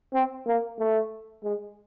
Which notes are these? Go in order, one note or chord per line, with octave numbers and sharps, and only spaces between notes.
C4
A#3
A3
G#3